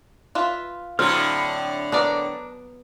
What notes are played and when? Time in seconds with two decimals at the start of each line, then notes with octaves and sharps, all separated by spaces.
0.35 F4 B4 E5
0.99 A2 D3 F#3 C4 F6
1.92 B3 D4 A#4 D5